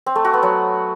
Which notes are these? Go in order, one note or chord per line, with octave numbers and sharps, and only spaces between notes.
C4
A3
F#4
B3
F#3